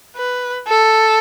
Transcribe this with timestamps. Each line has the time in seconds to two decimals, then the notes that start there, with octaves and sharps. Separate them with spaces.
0.16 B4
0.67 A4